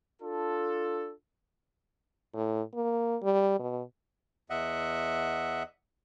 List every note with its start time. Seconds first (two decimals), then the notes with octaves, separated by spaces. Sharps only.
0.22 D4 F4 A4
2.34 A2
2.74 A#3
3.23 G3
3.59 B2
4.50 E2 D#5 E5 F#5